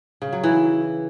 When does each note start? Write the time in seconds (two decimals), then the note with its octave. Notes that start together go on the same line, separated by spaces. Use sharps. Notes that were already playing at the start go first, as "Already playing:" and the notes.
0.22 C#3
0.33 F#3
0.44 E3